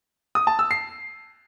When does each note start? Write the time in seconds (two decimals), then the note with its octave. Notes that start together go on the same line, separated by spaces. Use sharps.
0.35 D#6
0.47 A5
0.59 E6
0.71 C7